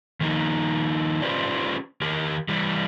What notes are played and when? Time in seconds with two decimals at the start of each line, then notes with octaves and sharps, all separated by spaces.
0.21 D#3 F3 A#3 D#4
1.22 C#4 F4 G4 B4 C5 D5
2.02 D#3 G4 A#4
2.49 E3 G3